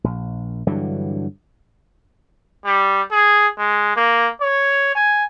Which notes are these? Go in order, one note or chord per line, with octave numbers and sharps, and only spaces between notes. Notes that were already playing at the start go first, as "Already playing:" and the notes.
A#1
G2 D3 E3 F#3
G3
G#4
G#3
A#3
C#5
G#5